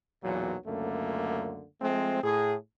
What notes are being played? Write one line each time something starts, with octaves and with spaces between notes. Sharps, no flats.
B1 E2 A#2 F#3
C#2 F#2 D3 A3 A#3
F3 G#3 A3 C4
A2 G#4